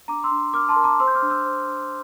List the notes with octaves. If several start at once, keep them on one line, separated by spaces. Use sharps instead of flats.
D4 A#5 D6
C6 E6
D4
A#4 D6 F6
A5 C6
A#4
A#5 D6
C5 C6 E6
G6
D6 F6
D4
E6 G6
C5
D4